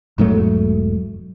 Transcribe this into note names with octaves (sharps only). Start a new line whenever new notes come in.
E1 G#2 F#3 A3